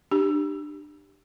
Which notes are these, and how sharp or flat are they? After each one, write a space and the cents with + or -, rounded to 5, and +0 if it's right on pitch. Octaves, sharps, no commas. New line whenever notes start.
D4 +30 G4 +0